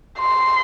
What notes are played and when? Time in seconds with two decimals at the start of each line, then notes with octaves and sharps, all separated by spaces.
0.19 C6